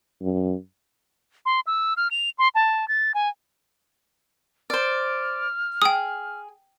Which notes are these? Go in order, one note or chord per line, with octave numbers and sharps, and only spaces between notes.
F#2
C6
E6
F6
F7
C6
A5
A6
G#5
C5 D5 F6
G#4 G5 D#6